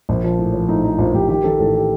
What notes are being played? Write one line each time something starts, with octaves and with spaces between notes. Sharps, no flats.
A#1
F3
A2
F3
A2 D#4
F3 D#4
A#1 F4
A#1 G4
D#3 G4
D#3 A4
A1 A4
G4